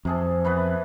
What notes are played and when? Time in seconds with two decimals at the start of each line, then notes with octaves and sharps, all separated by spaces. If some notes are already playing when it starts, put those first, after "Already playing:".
0.05 F2 C3 G#4 A4
0.45 E3 B3 B4